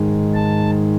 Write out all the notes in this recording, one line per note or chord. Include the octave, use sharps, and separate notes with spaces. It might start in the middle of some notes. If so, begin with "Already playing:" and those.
Already playing: G#2 D#3 G#3
A5